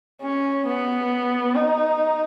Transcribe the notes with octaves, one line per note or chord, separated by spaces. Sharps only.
C#4
B3
D#4